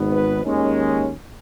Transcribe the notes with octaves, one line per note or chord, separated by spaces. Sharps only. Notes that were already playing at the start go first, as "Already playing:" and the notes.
Already playing: G#1 G#2 D#3 B3
B4
D#2 D#3 G#3 C#4